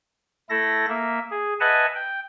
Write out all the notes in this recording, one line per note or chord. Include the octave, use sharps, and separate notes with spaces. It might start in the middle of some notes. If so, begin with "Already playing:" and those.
A3 E4 A4 A#6
A#3 E5
G#4
B4 D#5 E5 F#5 G#5 A5
G5